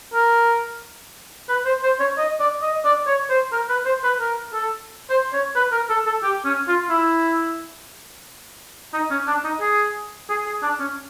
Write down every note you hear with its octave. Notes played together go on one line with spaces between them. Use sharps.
A#4
B4
C5
C5
C#5
D#5
D5
D#5
D5
C#5
C5
A#4
B4
C5
B4
A#4
A4
C5
C#5
B4
A#4
A4
A4
G4
C#4
F4
E4
D#4
C#4
D4
D#4
G#4
G#4
G#4
D4
C#4